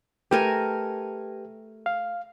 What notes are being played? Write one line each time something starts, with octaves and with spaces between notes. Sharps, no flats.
A3 G4 A#4 B4 G5 G#5
F5